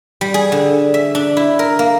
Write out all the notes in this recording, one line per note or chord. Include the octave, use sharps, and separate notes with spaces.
G3
G#4
D3
E5
D4
E4
A#4
A#3